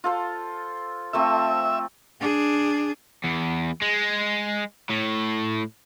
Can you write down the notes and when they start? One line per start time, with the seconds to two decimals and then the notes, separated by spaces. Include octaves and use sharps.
0.04 F4 A4 C5
1.13 F3 A3 C4 E5
2.20 D4 G#4
3.24 E2
3.82 G#3
4.90 A2